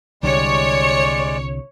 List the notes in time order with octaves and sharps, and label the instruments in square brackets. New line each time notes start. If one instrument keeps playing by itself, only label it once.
[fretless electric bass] C2 D3 G3 [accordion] G#3 D5 [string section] C#5